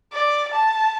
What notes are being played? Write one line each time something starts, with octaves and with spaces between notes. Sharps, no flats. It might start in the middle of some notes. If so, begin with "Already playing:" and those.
D5
A5